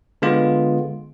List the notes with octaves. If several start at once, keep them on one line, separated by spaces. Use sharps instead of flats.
D3 G#3 B3 F4